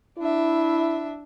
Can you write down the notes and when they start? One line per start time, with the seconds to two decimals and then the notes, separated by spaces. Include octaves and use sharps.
0.19 D4 E4 E5